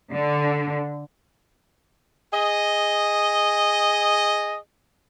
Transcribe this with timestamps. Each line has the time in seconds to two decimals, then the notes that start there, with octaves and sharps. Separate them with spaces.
0.13 D3
2.33 G#4 D#5